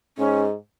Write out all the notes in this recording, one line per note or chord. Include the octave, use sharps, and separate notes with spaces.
G#2 C#4